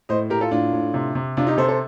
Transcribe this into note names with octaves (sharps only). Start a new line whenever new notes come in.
A2 C5 D#5
A2 G4 A#4
F4 A4
A2 D4 F4
A2
C3
C3
C3 D4 F4
D#4 G4
C3 A4 C5
A4 C5